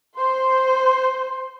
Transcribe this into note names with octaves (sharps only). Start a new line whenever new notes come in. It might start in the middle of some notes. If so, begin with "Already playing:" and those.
C5 C6